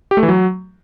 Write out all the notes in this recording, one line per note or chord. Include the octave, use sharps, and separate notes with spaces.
G4
A3
E3
F#3